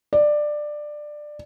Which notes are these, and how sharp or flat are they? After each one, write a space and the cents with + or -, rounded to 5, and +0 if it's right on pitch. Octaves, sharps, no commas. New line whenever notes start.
D5 +15